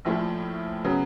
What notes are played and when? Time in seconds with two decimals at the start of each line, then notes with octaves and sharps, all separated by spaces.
0.05 A#1 A2 F3 A3
0.84 C#3 F#3 B3